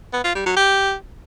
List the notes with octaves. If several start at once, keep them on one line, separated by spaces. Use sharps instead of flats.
B3
F4
G3
F#3
G4